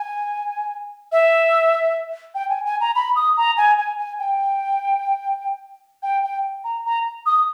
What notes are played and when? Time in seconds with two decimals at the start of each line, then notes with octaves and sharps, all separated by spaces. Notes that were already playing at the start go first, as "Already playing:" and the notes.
Already playing: G#5
1.12 E5
2.35 G5
2.49 G#5
2.65 G#5
2.81 A#5
2.95 B5
3.16 D#6
3.37 A#5
3.57 G#5
3.78 G#5
3.98 G#5
4.19 G5
6.03 G5
6.23 G5
6.64 A#5
6.85 A#5
7.26 D#6